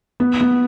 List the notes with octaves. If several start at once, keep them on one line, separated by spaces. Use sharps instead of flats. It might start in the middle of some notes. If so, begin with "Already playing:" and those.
B3
B3